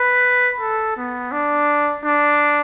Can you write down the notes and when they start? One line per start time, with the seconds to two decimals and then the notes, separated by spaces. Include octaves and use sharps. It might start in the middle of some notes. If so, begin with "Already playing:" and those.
Already playing: B4
0.61 A4
0.97 B3
1.32 D4
2.04 D4